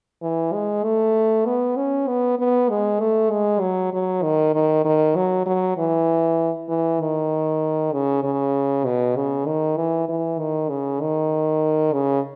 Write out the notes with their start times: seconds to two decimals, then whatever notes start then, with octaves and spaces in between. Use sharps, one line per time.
0.22 E3
0.53 G#3
0.84 A3
1.45 B3
1.77 C#4
2.07 B3
2.39 B3
2.70 G#3
3.00 A3
3.31 G#3
3.61 F#3
3.93 F#3
4.23 D#3
4.54 D#3
4.85 D#3
5.16 F#3
5.46 F#3
5.78 E3
6.69 E3
7.01 D#3
7.93 C#3
8.23 C#3
8.85 B2
9.17 C#3
9.46 D#3
9.77 E3
10.08 E3
10.39 D#3
10.70 C#3
11.01 D#3
11.93 C#3